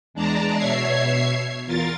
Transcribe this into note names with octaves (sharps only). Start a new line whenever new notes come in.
E2 G#3 D4 D5 A5 A#5
B2 C#5 E5 G#6 C7
E2 F4 A#4 A6